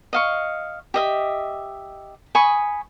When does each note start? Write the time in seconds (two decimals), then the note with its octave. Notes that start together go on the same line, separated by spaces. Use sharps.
0.13 D#5 F5 C#6
0.94 G4 D#5 E5
2.35 G#5 B5 C#6 D#6